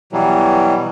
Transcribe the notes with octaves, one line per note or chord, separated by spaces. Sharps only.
B2 E3 F#3 G3